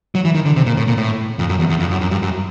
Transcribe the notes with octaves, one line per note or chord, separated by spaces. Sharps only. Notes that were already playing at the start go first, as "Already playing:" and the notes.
F#3
E3
D#3
D3
C3
A#2
A2
A#2
A2
F2
F#2
E2
E2
F2
F#2
F#2
G2
F#2